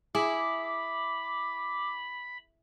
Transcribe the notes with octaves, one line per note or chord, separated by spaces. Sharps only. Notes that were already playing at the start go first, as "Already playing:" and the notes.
E4 G#4 B5 D6